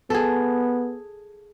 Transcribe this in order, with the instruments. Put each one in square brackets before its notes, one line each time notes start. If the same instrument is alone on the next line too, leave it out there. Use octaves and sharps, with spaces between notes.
[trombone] B3 [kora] G#4 A4